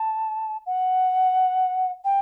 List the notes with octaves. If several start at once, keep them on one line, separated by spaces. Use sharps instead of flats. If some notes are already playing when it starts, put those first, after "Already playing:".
Already playing: A5
F#5
G5